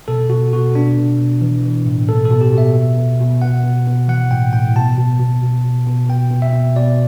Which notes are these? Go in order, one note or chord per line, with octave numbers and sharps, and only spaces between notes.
B2 A4
B2 F#4
B2 F#4
B2 D4
B2
B2
E3
E3
A2
B2 A4
A4
B2
G4
B2 E5
B2
B2
B2
B2 F#5
B2
B2
E3 F#5
A2 G5
A2 G5
B2 A5
B2
B2
B2
B2
B2
B2 G5
B2
E5
B2
B2 D5